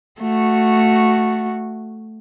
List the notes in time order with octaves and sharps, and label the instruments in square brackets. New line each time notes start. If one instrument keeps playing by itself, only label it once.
[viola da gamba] A3 F#4